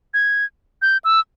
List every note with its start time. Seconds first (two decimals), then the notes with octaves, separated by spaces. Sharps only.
0.14 G#6
0.82 G6
1.04 E6